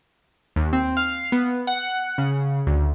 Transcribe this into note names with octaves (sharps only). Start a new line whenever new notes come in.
D#2
C4
F5
B3
F#5
C#3
D2